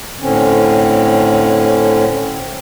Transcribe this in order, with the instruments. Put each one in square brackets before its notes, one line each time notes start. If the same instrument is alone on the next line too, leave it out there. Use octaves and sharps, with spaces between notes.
[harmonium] A2 D3 C4 C#4